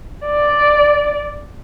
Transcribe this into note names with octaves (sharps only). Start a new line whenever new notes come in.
D5